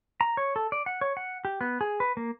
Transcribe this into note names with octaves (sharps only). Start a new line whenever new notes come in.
A#5
C#5
A4
D5
F#5
C#5
F#5
G4
B3
G#4
B4
A#3